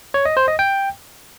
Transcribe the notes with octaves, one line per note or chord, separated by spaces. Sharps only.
C#5
D#5
C5
D#5
G5